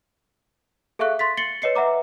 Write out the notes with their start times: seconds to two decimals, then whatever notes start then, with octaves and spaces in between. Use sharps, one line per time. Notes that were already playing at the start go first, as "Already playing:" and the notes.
0.99 G#4 A4 E5 F5 C#6 F#6
1.19 C6 A6 B6
1.37 A6 C7 C#7 F#7 G7
1.62 B4 C#5 D#5 C7 C#7
1.75 B4 E5 F#5 A#5 D6